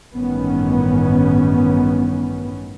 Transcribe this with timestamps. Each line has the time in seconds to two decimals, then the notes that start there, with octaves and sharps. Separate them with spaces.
0.14 A1 G2 D#3 B3 C#4